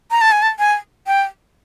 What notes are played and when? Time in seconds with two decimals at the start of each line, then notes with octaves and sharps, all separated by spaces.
0.11 A#5
0.21 A5
0.32 G#5
0.42 A5
0.59 G#5
1.07 G5